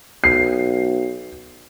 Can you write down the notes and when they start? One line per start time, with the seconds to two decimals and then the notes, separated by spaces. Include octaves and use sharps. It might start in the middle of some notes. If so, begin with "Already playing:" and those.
0.24 B1 C7